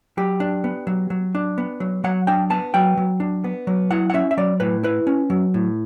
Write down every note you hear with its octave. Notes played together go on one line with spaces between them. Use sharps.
F#3 G4
D4
B3
F#3
F#3
D4
B3
F#3
F#3 F#5
D4 G5
B3 A5
F#3 G5
F#3
D4
B3
F#3
E4 F#5
F#5
C#4 E5
E5
F#3 D5
A2 B4
E4 B4
C#4
F#3
A2